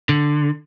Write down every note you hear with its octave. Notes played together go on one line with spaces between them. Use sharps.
D3